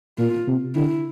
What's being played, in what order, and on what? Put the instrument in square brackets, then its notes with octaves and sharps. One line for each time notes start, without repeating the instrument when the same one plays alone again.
[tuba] A#2 [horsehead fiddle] F4
[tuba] C3
[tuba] D3 [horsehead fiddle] E4